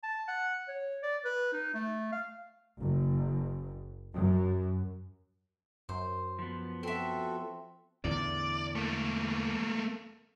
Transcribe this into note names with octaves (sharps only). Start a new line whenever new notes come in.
A5
F#5
C#5
D5
B4
D#4
A3
F5
F#1
F#2
F#2 C5
F3 B3
C4 F#4 A4 E5
E2 A2 D3 D5
A3 A#3